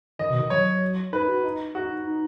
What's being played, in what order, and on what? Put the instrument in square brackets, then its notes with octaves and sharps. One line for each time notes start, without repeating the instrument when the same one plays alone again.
[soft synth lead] D#3 [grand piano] D#5
[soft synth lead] B2
D#3
[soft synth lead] F#3 [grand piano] C#5
[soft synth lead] D#4 [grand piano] B4
[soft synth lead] F#4
D#4
[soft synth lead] D#4 [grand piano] F#4
[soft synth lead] D#4
D#4